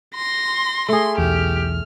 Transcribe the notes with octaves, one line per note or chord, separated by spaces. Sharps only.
C6 A#6
A3 G#4 C6
B1 E2 G4 F6